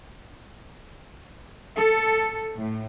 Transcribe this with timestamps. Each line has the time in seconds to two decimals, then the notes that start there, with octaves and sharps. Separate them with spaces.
1.77 A4
2.56 A2